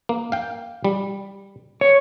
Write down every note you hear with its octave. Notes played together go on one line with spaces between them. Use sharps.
A#3
F5 G5
G3
C#5